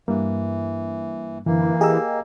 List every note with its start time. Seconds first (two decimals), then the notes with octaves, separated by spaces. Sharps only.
0.08 G2 E3 A#3
1.46 F#2 D3 E3 A#3
1.81 G4 G#4 D#5 G#5 A#5 E6